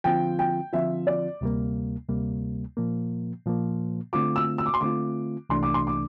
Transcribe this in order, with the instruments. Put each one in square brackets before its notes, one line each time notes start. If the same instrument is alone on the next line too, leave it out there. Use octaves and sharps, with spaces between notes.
[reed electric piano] D3 F3 C4 F4 [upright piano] G5
[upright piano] G5
[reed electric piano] D3 F3 C4 F4 [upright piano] E5
[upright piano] D5
[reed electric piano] D2 C3 G3 A#3
D2 C3 G3 A#3
A#2 F3 A#3
A#2 F3 A#3
[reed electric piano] D3 A3 C4 F4 [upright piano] D6
[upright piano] E6
E6
D6
C6
[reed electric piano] D3 A3 C4 F4 [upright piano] D6
[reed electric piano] C2 C3 E3 A3 D4 [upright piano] C6
[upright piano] D6
C6
D6